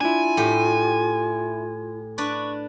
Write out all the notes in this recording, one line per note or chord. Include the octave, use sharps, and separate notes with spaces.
D4 E4 F4 G#5
A2 G4
D4 B4 D5 C#6